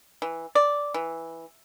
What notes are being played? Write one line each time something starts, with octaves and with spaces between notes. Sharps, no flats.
E3
D5
E3